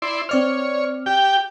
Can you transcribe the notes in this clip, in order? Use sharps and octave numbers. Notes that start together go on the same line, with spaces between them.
E4 D5 C6
C4 C#5 D5 F6
G4 G5